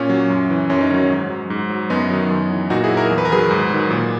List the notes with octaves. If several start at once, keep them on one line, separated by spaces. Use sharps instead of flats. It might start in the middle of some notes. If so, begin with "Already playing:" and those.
Already playing: A#2 C#4
F#3
F#2
E3
F#2 C#4
D#4
D#3 F#3 C#4
G#2
F#3
G#2
F#3
F#2 B3 D#4
D#3 F#3
F#2
E3
A#2 D#4 F#4
E4 G#4
F#3
F#4 A#4
E2
B4
A#4
D#3 F#3 G#4 B4
G#2
D#3 F#3
A#2